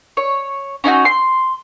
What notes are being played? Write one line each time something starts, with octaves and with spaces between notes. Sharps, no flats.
C#5
C#4 D#4 E4 F#4
C6